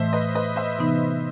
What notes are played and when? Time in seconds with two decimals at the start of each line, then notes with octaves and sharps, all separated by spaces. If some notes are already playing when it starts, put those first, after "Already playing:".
Already playing: A2 E3 A3 C5 D#5 E5
0.13 B4 D#5
0.35 B4 D#5
0.56 C5 E5
0.78 C3 E3 B3 D#4